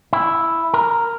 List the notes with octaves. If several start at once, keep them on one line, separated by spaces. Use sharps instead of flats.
E4
A#4